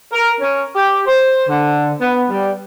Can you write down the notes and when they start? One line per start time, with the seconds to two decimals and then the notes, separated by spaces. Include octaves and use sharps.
0.11 A#4
0.41 C#4
0.76 G4
1.06 C5
1.47 D3
2.01 B3
2.30 G3